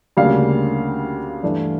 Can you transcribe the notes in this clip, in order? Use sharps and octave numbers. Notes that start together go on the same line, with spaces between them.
D2 C#3 G3 A#3 D4 F5
G2 E3 A3 D4